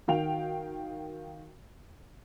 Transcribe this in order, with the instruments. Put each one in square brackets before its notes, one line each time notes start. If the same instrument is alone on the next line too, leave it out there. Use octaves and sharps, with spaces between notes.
[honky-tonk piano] D#3 F#4 F5 G5 F7